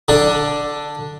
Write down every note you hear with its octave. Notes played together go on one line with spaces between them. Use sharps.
D3 D4